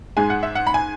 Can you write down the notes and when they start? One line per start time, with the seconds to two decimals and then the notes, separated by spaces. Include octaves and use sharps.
0.17 G#2 G#3 G#5
0.30 F#5
0.43 E5
0.55 F#5
0.67 B5
0.74 G#5